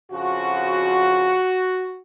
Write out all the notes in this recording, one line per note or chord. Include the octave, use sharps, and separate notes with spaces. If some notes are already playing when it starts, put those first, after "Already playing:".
F2 C#3 F3 F#4